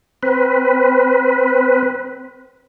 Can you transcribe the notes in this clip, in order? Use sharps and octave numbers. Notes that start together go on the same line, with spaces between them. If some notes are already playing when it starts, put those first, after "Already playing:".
C4 B4